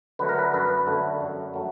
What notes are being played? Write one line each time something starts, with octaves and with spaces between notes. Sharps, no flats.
D3 F#3 A3 B4
A#4
B4
F#2 B4
D3 F#3 A3
F#2
F#3 A3